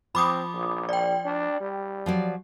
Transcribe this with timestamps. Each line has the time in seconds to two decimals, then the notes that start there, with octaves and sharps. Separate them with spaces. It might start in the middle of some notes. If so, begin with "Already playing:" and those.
0.15 F3 C4 B5 D6 D#6
0.54 A#1
0.89 D5 G5
1.25 D4
1.60 G3
2.06 F3 F#3 D5